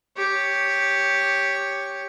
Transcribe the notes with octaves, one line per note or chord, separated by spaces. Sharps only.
G4 C#5